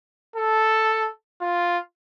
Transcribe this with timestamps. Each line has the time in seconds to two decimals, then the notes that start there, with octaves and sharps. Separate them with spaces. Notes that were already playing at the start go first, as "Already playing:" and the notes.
0.36 A4
1.41 F4